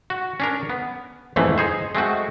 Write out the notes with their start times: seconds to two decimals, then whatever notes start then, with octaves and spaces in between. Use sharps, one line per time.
0.10 F#4
0.40 C#4 D4 A#4
0.70 B3
1.36 A1 F2 G#2 E3 A3
1.58 D#4 G#4 C5
1.95 G#3 A3 C4 F#4